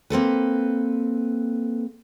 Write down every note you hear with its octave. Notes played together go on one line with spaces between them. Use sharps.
A#3 C4 A4 B4